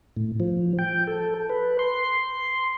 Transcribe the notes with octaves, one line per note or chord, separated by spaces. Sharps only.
A2
F3
G5
A4
B4
C6